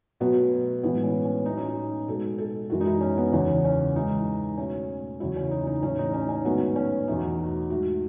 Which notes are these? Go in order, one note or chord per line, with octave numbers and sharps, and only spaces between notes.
B2 F#3 A3 B3
A2 E3 G#3 B3
C#4
C#4
A2 F#3 A3 D#4
C#4
D#4
B2 G#3 A4
A4
F#2 E3 G#3 F#4
D#4
E4
C#4
B3
E2 C#3 E3 C#4
C#4
G#2 E3 G#3 D#4
B2 A3 C#4
E2 C#3 F#3 A3 E4
C#4
D#4
D#4
A2 E3 A3 C#4
D#4
C#4
C#4
G#2 D#3 F#3 A3 B3
C#4
E2 B2 A3 D#4
F#4
G#2 F#3 A3 F#4